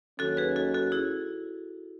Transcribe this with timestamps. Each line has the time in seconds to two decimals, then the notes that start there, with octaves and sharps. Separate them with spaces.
0.19 D#2 D#3 F#3 C#4 F#4 A4
0.37 G#4 B4
0.56 F#4 A4
0.74 F#4 A4
0.92 E4 G#4